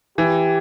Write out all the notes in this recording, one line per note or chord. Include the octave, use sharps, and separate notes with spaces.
E3 G4